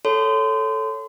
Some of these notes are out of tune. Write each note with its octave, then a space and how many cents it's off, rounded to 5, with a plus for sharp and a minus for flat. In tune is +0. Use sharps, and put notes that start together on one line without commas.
A4 +0 C#5 +0 C6 -35